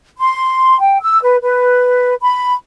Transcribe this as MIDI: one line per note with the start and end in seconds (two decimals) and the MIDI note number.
0.18 0.76 84
0.80 0.97 79
1.01 1.19 88
1.22 1.37 71
1.42 2.14 71
2.22 2.54 83